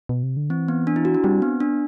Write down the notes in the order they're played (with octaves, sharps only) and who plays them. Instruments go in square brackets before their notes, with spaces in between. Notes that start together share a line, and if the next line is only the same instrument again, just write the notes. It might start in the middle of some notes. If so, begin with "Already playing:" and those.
[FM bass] B2
C3
D3
[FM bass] E3 [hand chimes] C4
[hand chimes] B3
D4
E4
F#4
D4
[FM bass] G3 [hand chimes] C4
[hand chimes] B3
D4